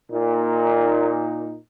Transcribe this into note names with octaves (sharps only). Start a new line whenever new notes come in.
A#2 D#4